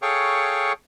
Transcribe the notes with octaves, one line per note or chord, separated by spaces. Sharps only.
G#4 A4 C#5 F5 G5 C#6